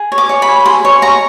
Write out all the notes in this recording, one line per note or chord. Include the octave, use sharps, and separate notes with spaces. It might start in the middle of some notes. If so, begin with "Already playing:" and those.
Already playing: G#4
C#5
D6
C#5
B5
G#4
G#4 C6
C#5
C#5 A#5